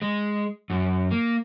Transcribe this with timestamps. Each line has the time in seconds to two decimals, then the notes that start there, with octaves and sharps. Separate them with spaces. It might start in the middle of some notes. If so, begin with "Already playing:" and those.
0.02 G#3
0.70 F#2
1.11 A#3